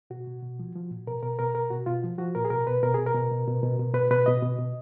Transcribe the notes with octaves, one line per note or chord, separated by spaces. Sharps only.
B2 F#4
B2
B2
F3
F3
A#2
B2 A#4
B2 A#4
B2 A#4
B2 A#4
B2 F#4
B2 F4
F3
F3 F#4
A#2 A#4
G#4
B2 A#4
B2 B4
B2 A#4
B2 G#4
A#4
B2
B2
B2
B2
B2
B2 B4
B2 B4
B2 D#5
B2
B2